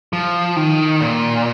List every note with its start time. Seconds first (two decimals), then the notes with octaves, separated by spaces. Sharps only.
0.13 F3
0.56 D#3
1.01 A#2